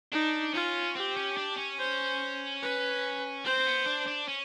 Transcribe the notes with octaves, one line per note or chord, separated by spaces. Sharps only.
D4 D#4
C#4 F4
C4 G4
C#4
D4
C#4
C5
B4
C4 C5
B3
D4
D4
C#4